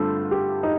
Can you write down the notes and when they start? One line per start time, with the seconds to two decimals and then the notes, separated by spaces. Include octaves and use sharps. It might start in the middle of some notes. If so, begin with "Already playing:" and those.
Already playing: G2 D3 A3 C4 F4 A4
0.31 G4
0.63 D#4